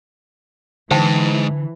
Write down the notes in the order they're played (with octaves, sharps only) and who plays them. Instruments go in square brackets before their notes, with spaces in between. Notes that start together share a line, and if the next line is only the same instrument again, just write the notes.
[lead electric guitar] G#2 [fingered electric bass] D3 [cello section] E3 [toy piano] C5 G5 A5